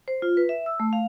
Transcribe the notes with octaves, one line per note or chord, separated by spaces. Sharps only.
C5
F4
B4
E5
E6
A3
F5